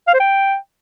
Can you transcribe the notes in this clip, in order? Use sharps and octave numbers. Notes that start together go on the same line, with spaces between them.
F5
C5
G5